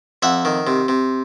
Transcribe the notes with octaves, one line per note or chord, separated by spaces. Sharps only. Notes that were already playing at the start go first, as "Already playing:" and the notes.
F2 E5 F#5
D#3
C3
C3